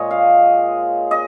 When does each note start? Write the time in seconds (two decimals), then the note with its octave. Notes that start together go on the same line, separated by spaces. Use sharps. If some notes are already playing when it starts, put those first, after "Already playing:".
Already playing: A#2 G#3 C#5 D#5
0.11 F5
1.11 D#5